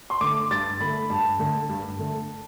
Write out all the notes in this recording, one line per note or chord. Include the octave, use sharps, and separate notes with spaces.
C6
D3 A3 D6
G2 A6
D3 A3 B5
G2 A5
D3 A3
G2
D3 A3